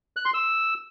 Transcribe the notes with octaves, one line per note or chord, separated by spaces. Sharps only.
F#6
C6
E6